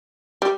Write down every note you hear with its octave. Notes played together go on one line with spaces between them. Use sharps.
G3